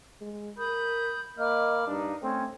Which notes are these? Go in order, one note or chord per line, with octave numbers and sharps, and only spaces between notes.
G#3
A#4 B5 D#6 G6
A#3 D#5 B5 D6 F6
G2 D4 D#4
A3 C4 C#4